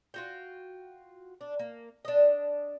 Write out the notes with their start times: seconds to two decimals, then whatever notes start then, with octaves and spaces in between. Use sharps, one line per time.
0.14 F4 F#4 G5
1.41 D4
1.59 A#3
2.05 D4 D#5